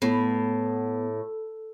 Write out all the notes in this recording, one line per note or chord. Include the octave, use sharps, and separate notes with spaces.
A2 B3